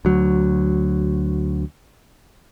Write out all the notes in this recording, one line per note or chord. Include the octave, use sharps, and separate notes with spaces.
D2 F#3